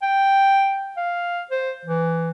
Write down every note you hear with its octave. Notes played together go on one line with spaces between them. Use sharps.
G5
F5
C5
E3